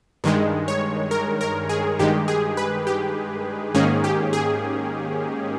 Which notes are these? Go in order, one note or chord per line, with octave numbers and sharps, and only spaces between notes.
G2 D#3 G#3
C#5
A#4
A#4
G#4
G2 D#3 G#3 G4
G#4
B4
G4
G#2 D#3 A#3 C#4 G#4
G4
G#4